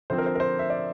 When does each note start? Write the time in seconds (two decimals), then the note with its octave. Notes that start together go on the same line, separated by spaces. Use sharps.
0.10 D3 F3 C4 C5
0.18 A#4
0.26 C5
0.35 A#4
0.40 C5
0.59 E5
0.70 D5